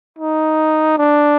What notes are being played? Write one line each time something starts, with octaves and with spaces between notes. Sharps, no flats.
D#4
D4